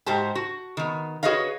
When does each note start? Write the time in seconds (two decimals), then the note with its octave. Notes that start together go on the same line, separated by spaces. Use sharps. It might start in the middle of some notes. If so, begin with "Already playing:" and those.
0.06 G#2 F#4 G4 C5 A5
0.35 F#4
0.77 D#3 B3
1.23 F#4 G#4 B4 C#5 D#5 F5